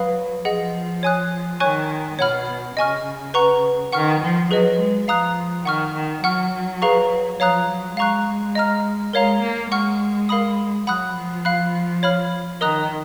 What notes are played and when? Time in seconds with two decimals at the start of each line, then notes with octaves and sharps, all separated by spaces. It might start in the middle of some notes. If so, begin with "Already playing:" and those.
Already playing: F#3 B4 F5 B5 D#6
0.45 F3 G#4 D#5 F#5
1.03 C#5 G#5 D#6 F#6
1.60 D#3 C#5 G#5 C#6 F#6
2.19 B2 C#5 F#5 B5 F6
2.77 C#3 D#5 G#5 C#6 F6
3.34 B4 F#5 A#5 C#6
3.92 D#3 F#5 C#6 F6
4.21 F3
4.51 F#3 G#4 B4 D#5
4.79 G#3
5.08 F3 F5 A#5 D#6 F#6
5.65 D#3 F#5 C#6 F6
5.95 D#3
6.24 F#3 F#5 C#6 F6
6.82 G#4 B4 F5 A#5 C#6
7.40 F3 C#5 F5 A#5 D#6 F#6
7.69 F#3
7.97 G#3 F5 A#5 C#6 F#6
8.55 D#5 A#5 F6
9.13 G#3 A#4 C#5 F5 A#5
9.42 A#3
9.71 G#3 F#5 C#6 F6
10.29 A#4 F5 B5 D#6
10.87 F#3 F#5 B5 D#6 F#6
11.16 F3
11.45 F5 B5 F#6
12.03 C#5 F5 B5 F6
12.61 D#3 A#4 D#5 A#5 D#6 F#6